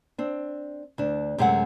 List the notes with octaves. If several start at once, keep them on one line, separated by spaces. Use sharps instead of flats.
C4 D4
D2 D4
F#2 C3 G#3 A3 F#5